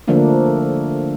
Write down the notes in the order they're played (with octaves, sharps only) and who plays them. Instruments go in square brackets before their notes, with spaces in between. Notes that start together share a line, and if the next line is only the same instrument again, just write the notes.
[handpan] D3 F3 A3 A#3 D4